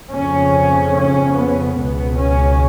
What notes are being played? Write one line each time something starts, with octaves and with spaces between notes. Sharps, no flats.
F2 C#3 C#4
C#4
B3
C#2 B2 B3
C#4